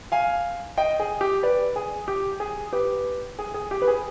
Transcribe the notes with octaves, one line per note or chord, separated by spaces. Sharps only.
F5 G#5
D#5 G5
G#4
G4
B4 D5
G#4
G4
G#4
G4 B4
G#4
G#4
G4
B4
G#4